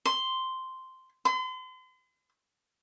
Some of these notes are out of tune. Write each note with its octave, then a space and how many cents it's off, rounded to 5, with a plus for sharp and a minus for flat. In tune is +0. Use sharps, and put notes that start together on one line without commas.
C6 -5
C6 -40